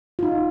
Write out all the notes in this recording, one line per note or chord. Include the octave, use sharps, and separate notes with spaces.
F4
D#4